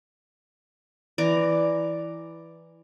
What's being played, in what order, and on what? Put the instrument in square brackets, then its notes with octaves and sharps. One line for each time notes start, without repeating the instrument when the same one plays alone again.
[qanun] E3 D5 A#5